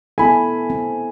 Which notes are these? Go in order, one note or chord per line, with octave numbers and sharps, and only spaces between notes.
B3 E4 A4 G#5 B5
C4